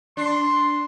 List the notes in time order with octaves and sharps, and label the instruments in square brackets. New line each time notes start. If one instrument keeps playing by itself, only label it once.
[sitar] D4 [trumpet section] C6